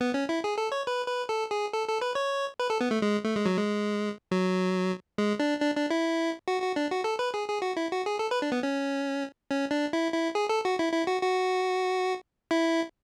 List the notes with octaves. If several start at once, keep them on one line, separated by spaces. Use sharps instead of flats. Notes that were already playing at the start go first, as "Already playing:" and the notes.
B3
C#4
E4
G#4
A4
C#5
B4
B4
A4
G#4
A4
A4
B4
C#5
B4
A4
B3
A3
G#3
A3
G#3
F#3
G#3
F#3
G#3
D4
D4
D4
E4
F#4
F#4
D4
F#4
A4
B4
G#4
G#4
F#4
E4
F#4
G#4
A4
B4
D4
B3
C#4
C#4
D4
E4
E4
G#4
A4
F#4
E4
E4
F#4
F#4
E4